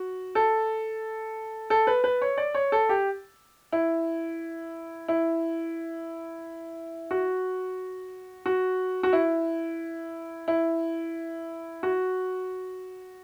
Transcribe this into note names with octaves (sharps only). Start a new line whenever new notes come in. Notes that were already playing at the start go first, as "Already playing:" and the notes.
Already playing: F#4
A4
A4
B4
B4
C#5
D5
C#5
A4
G4
E4
E4
F#4
F#4
F#4
E4
E4
F#4